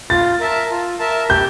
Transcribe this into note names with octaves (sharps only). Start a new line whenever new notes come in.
F4 A6
A#4 E5 A5
F4
A#4 E5 A5
G4 G6